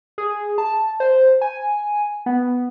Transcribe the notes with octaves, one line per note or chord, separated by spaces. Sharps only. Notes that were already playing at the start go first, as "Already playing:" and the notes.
G#4
A5
C5
G#5
B3